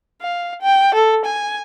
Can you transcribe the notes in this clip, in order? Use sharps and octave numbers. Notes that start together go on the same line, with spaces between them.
F5
G5
A4
G#5